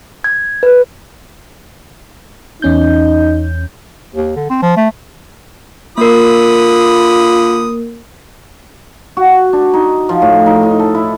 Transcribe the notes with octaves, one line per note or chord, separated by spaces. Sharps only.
G#6
B4
E2 C#4 D#4 G6
D#2
D3
C4
F3
A3
D3 A#3 F4 A#4 B5 D#6
F#4
D4
D#4
F3
A2
D#4
D#4
A4
E4